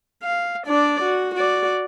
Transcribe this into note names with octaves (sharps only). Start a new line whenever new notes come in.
F5
D4 D5
F#4
F#4 D5